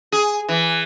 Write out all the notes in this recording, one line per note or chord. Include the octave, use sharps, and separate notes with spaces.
G#4
E3